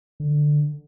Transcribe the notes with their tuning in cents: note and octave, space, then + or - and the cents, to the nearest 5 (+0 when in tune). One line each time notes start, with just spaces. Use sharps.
D3 +10